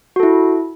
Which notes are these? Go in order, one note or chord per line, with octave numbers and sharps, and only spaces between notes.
E4 F#4 A4